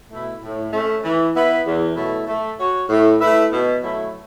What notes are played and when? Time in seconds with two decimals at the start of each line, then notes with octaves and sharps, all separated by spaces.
0.11 B2 A3 E4
0.42 A2
0.73 A3 C#4
1.03 E3
1.35 B3 E4 B4 E5
1.66 E2
1.96 B2 F#3 A3 E4
2.28 A3
2.59 F#4 C#5
2.89 A2
3.20 A3 E4 B4 E5
3.52 B2
3.83 F#3 A3 E4